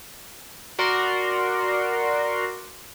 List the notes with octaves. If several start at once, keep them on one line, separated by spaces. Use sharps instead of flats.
F#4 A#4 D5 C6